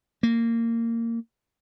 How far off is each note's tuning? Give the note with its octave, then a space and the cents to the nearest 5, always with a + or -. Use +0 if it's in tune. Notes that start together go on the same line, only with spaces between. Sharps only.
A#3 -20